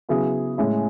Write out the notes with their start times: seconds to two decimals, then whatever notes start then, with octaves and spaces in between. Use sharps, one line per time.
0.09 C#3 F#3 B3 E4 G#4
0.58 A2 G#3 C#4 E4